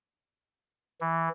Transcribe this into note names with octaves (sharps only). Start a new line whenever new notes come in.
E3